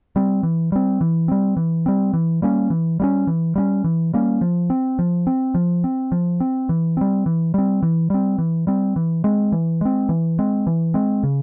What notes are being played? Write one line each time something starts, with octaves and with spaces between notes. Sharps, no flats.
G3 C4
E3
G3 C4
E3
G3 C4
E3
G3 C4
E3
G3 A#3 C#4
E3
G3 A#3 C#4
E3
G3 A#3 C#4
E3
G3 A#3 C#4
F3
C4
F3
C4
F3
C4
F3
C4
E3
G3 C4
E3
G3 C4
E3
G3 C4
E3
G3 C4
E3
G#3 C4
E3
G#3 C4
E3
G#3 C4
E3
G#3 C4
C#3